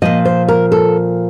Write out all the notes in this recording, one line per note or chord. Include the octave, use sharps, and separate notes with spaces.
A#2 F3 D#5
C5
A#4
A4